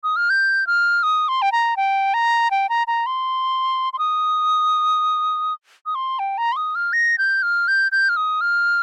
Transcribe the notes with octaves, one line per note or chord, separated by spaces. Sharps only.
D#6
F6
G6
F6
D#6
C6
G5
A#5
G5
A#5
G5
A#5
A#5
C6
C6
D#6
D#6
C6
G5
A#5
C6
D#6
F6
A#6
G6
F6
G6
G6
F6
D#6
F6